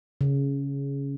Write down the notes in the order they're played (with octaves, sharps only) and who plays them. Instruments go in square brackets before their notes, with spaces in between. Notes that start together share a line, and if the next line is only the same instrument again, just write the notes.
[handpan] C#3